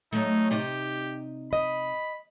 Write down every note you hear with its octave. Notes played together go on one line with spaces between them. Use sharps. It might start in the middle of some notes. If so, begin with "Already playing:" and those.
F#3 A3 D#4
C3 D#4 G4 D5
D#5 B5